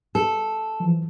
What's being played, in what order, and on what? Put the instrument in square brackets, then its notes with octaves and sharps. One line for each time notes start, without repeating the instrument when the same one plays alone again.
[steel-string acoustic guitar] A4
[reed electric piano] E3 F3